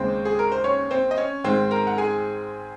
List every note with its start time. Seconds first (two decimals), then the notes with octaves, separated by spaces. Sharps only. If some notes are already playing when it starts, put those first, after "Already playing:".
Already playing: D#2 C#3 G#3 C4 C5
0.25 G#4
0.39 A#4
0.52 C5
0.64 C#4 C#5
0.91 C4 C5
1.11 D#5
1.18 C#4 C#5
1.44 G#2 D#3 G#3 C4 C5
1.71 A#4 A#5
1.87 F#5
1.98 G#4 G#5